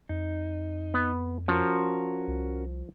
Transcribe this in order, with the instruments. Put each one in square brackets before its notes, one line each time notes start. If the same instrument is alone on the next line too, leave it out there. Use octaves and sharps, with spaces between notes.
[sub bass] F2 [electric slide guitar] D#4
[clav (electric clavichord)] B3
[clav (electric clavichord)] F3 [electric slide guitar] C#4 F#4 A#4
[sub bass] C2